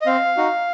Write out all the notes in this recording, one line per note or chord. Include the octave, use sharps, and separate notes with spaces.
D#5
C4 F5
D#4 F#4